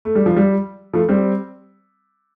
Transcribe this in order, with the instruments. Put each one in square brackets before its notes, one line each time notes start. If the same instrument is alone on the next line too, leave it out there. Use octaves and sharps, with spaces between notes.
[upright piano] A3
G3
F3
G3
F3 A3
G3 C4